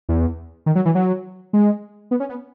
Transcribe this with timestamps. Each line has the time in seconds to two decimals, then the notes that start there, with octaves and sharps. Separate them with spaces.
0.09 E2
0.66 D#3
0.75 F#3
0.85 E3
0.95 F#3
1.53 G#3
2.11 B3
2.20 C#4
2.29 B3